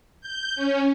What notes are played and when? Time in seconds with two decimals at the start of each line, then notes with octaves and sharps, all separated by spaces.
0.21 G6
0.56 C#4